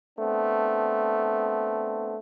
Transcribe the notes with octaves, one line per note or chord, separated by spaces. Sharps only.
A3 B3 C4 D4